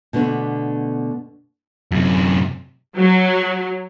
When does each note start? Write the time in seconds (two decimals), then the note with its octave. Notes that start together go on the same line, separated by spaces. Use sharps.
0.13 B2 D3 A3 B3 D4
1.92 F#2 C3
2.97 F#3